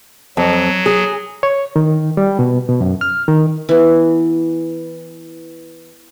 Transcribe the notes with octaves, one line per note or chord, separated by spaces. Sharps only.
F2 F#3
G#4
C#5
D#3
G3
B2
B2
F#2
F6
D#3
E3 B3